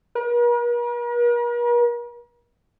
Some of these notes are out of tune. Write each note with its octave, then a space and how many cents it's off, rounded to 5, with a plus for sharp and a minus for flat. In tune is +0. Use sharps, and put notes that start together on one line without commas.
A#4 +45